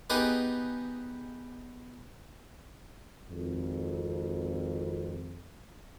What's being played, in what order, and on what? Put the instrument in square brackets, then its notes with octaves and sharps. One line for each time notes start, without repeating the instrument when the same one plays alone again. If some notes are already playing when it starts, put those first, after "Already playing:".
[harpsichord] B3 D#4 G4 G#4 B4
[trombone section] G#1 F2